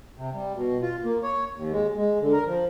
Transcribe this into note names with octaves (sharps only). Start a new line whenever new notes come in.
C3
G3
B2
F4
A#3
C#5
D#2
G#3
G#3
D3
A#4
F3